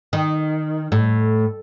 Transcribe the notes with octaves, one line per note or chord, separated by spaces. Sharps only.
D#3
A2